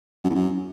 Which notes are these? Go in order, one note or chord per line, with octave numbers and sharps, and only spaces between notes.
F#2
E2
F#2